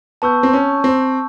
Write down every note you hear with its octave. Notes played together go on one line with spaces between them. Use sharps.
B3 A5 C#6 E6 G6
C4
C#4
C4